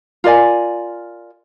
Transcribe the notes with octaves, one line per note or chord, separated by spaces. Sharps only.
F4 A#4 D5 G#5